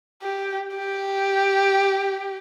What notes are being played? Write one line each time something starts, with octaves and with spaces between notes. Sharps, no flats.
G4
G4